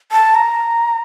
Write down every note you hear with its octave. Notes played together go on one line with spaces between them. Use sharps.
A5
A#5